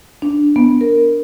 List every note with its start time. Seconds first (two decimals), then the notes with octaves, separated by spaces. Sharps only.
0.22 D4
0.56 B3
0.81 A#4